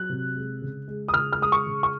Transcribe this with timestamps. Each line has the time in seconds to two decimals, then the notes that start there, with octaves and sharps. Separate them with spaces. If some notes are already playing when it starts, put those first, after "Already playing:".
Already playing: F#3 F#6
0.09 C3
0.36 G#3
0.62 C#3
0.88 G#3
1.08 D#6
1.13 C#3 F6
1.32 F6
1.40 G#3 D#6
1.52 C#6
1.66 C#3
1.83 C#6